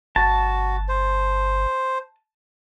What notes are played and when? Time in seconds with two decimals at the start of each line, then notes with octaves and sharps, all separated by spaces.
0.16 G1 F#4 A5
0.89 C5